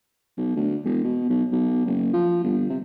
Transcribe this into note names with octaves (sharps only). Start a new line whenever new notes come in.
B1
D2
E1
B2
B1
B1
F#1
F3
G1
C3